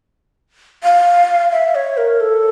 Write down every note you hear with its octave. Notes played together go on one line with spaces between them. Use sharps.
F5
E5
C#5
A#4
A4